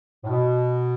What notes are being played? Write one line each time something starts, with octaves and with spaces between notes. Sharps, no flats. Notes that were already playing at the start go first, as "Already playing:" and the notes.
A2
B2